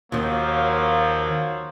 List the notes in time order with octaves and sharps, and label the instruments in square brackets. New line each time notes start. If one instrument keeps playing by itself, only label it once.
[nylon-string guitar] D#2 D#3 [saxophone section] F3 F#3 [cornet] A#3